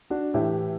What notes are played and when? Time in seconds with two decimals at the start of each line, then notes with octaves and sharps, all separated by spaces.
0.10 D4 F#4
0.34 A2 E3 E4 G4